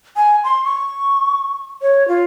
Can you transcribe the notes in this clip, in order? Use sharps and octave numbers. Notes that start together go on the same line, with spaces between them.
G#5
C6
C#6
C#5
F4